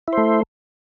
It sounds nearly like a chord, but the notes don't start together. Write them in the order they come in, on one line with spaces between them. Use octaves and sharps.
E4 C5 A3